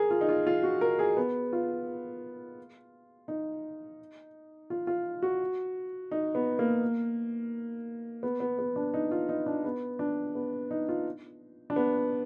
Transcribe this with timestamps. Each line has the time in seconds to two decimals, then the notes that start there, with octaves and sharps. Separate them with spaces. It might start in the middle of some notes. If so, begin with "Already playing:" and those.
Already playing: G#4 A#4
0.11 F4
0.21 D#4
0.29 F4
0.47 F4
0.63 F#4
0.81 A#4
0.99 G#4
1.17 B3
1.53 F4
3.28 D#4
4.70 F4
4.87 F4
5.22 F#4
6.11 D#4
6.35 B3
6.59 A#3
8.23 B3
8.40 B3
8.59 B3
8.76 D4
8.94 D#4
9.11 F4
9.29 D#4
9.46 D4
9.65 B3
9.99 D4
10.35 B3
10.71 D#4
10.89 F4
11.70 D4
11.76 B3